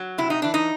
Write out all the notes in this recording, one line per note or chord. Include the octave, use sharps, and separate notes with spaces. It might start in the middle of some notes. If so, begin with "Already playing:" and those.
Already playing: F#3
C3 E4
D#4
E3 D4
D#4